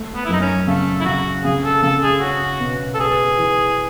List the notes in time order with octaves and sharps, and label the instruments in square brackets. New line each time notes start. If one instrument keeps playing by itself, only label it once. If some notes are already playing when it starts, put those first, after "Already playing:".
Already playing: [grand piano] A3
[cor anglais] B3
E4
[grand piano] F#2 [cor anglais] D#4
[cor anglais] C#4
[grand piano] C#3 [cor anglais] A3
[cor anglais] E4
[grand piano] C#3 [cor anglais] F#4
[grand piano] C#3 [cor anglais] G#4
[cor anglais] A4
[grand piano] C#3 [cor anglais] A4
[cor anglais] G#4
[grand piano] C#4 [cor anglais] F#4
[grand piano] B2
[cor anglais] A4
[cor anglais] G#4 [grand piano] B4
[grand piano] E3